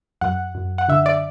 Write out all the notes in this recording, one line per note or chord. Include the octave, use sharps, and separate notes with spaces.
F#2 F#5
F#2
F#5
D3 E5
D5